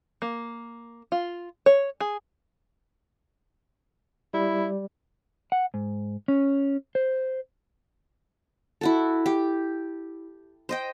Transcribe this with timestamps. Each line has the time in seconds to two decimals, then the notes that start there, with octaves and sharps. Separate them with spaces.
0.22 A#3
1.12 F4
1.66 C#5
2.01 G#4
4.34 G3 E4
5.52 F#5
5.74 G#2
6.28 C#4
6.95 C5
8.81 E4 F#4 A4
9.26 G4
10.69 C5 D#5 G5